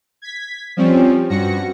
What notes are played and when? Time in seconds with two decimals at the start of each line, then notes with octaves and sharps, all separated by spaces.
0.22 G#6 B6
0.77 F3 G3 C4 C#4
1.30 G2 F#4 A#6 C#7